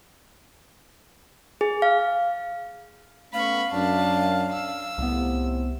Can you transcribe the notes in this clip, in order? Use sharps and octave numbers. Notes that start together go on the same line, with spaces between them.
G#4
F5
A3 B3 C#4 F5 B5 C#6
F#2 D4 A5
E6
C2 A2 C3 B3